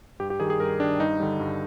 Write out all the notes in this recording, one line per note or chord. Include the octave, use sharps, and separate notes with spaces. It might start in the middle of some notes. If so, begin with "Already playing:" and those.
G2 G4
G4
D#3 G3 G#4
G#4
G2 A#4
D#3 G3 D4
G2 D#4
D3 G3
G2